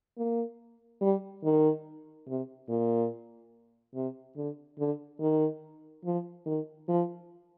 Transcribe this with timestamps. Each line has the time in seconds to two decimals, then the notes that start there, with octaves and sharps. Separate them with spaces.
0.17 A#3
1.01 G3
1.44 D#3
2.28 C3
2.69 A#2
3.95 C3
4.36 D3
4.79 D3
5.21 D#3
6.05 F3
6.46 D#3
6.88 F3